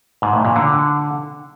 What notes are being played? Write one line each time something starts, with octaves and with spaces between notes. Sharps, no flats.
G#2
A2
A#2
D3